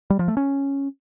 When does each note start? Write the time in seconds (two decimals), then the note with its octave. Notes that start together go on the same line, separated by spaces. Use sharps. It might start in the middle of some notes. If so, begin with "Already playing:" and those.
0.10 G3
0.19 F3
0.28 A3
0.37 C#4